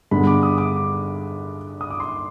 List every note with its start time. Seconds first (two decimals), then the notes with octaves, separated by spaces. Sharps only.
0.11 G2 D3 G#3 B3 B5
0.27 D6
0.43 D#6
0.58 D6
1.81 D#6
1.90 D6
2.00 C6